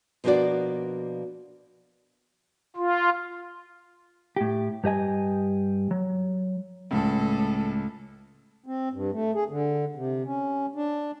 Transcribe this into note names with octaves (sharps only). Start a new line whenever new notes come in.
B2 F3 A#3 D4 F#4 D5
F4
A2 G4
G2 G4 D#5 G#5
F#3
C#2 A2 A4
C4
G2
A3
G#4
D3
C3
C#4
D4